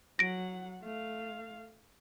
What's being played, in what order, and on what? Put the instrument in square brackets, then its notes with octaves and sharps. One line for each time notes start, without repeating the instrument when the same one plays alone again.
[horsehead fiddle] F#3 F#5 [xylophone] A#6 D7
[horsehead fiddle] A3 F5